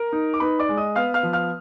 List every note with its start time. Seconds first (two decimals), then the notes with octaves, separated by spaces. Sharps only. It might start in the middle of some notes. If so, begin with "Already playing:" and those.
Already playing: A#4 A#5
0.13 D#4
0.34 D6
0.40 D#4 B4 B5
0.59 D5 D6
0.69 G#3
0.77 D#5 D#6
0.95 B3 F5 F6
1.14 F5 F6
1.23 F3
1.33 F5 F6